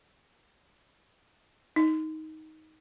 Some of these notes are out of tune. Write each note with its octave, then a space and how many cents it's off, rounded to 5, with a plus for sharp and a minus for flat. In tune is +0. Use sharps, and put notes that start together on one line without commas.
D#4 +15